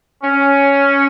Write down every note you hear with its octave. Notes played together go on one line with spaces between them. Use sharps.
C#4